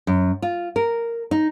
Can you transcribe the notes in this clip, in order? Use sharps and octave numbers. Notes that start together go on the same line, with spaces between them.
F#2
F4
A#4
D#4